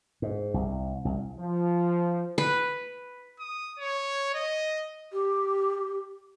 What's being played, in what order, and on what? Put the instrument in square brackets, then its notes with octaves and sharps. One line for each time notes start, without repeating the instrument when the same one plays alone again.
[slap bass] G#2
C2
C2
[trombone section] F3
[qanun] B4
[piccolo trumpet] D#6
C#5
D#5
[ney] G4